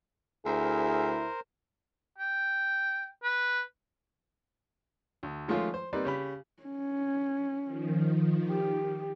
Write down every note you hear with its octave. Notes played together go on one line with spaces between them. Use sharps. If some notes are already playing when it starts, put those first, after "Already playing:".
D2 E4 G#4 A#4 C5
G5
B4
D2
D#3 F3 G#3 A3 C#4 F4
C5
G3 A#3 C4 D#4 B4 D5
C#3 G4 B5
C#4
D#3 F3
G4